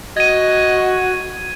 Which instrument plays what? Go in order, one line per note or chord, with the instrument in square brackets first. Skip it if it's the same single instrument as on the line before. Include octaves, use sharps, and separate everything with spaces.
[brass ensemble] F#4 [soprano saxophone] D#5 [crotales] G#6 D#7